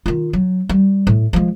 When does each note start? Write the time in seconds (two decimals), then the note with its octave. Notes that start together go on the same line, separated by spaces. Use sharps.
0.06 D#3 F4
0.33 F#3
0.69 G3
1.07 A2
1.33 F3 G#3